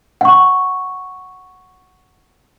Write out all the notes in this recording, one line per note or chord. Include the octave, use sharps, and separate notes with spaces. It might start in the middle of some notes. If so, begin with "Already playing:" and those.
F#5 C#6